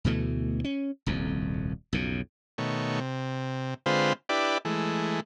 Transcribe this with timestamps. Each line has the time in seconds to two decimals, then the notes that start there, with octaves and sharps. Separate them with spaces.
0.04 D2 B2 E3 A3
0.64 C#4
1.06 D#1 C2 F2
1.93 B1 F2 C#3
2.58 B2 D#3 A3 C#5
3.00 C3
3.86 D3 G#3 C4 F4 B4 C5
4.29 D4 E4 G4 B4 D5
4.65 E3 G#3 A3